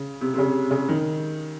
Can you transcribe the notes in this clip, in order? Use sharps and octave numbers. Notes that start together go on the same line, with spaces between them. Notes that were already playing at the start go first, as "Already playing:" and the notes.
Already playing: C#3
C3
C3
C#3
C#3
D#3